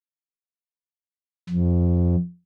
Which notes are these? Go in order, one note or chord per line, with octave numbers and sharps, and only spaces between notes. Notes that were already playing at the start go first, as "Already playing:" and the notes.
F2